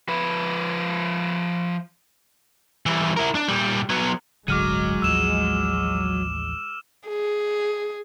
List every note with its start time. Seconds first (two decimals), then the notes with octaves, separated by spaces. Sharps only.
0.09 F3 B4
2.86 E3 G3
3.17 E4 A#4
3.35 D4
3.48 A#2 G3
3.90 F#3 B3
4.48 D1 G1 D3 F#3 G#3 D6 F6 D#7
5.02 A1 D#2 F3 E6 E7 F7
7.08 G#4